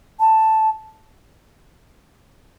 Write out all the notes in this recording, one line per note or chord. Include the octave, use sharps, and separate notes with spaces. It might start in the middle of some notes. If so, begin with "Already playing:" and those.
A5